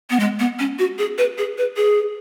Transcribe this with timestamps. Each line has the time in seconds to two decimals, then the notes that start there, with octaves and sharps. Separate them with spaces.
0.10 B3
0.20 G#3
0.39 B3
0.59 C#4
0.79 F#4
0.98 G#4
1.18 B4
1.38 G#4
1.58 B4
1.77 G#4